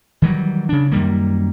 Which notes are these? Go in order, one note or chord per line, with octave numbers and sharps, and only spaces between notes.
D#3 E3 F#3 G3
C#3 D4
F#2 D#3 G3 A#3